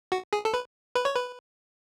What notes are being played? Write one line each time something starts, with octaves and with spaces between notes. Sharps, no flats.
F#4
G#4
A4
B4
B4
C#5
B4